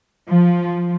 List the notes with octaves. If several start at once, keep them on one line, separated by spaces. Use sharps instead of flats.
F3